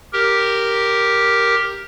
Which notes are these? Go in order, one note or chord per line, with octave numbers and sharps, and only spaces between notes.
G4 A#4